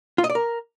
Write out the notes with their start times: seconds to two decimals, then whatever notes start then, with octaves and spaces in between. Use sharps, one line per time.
0.18 F4
0.24 D#5
0.30 D5
0.35 A#4